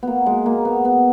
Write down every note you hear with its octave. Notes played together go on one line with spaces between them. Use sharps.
A#3 B3
G#3
A#3
B3
B3